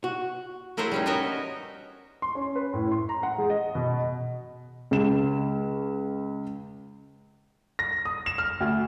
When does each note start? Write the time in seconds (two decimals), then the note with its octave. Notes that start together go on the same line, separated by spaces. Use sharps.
0.04 F#4
0.77 A#3 E4 F#4 G#4 C5 C#5
0.91 G3 C#4 D#4
1.06 B3 F#4 A#4 C#5 D#5 E5
2.22 C6
2.35 C#4
2.56 B4
2.73 A2
2.92 C6
3.09 A#5
3.23 F#5
3.38 G#3
3.50 D#5
3.75 B2
4.91 C#2 E7
7.79 A#6
8.05 D#6
8.26 E7
8.38 F6
8.61 D2